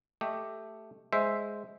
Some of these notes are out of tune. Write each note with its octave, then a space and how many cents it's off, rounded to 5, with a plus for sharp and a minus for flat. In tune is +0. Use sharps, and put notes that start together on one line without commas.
A3 +0 G4 +0 D#5 +0
G#3 +0 C5 +0 E5 +0